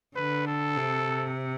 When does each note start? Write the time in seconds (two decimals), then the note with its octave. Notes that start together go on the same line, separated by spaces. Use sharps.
0.16 D3 B4
0.47 A4
0.77 C3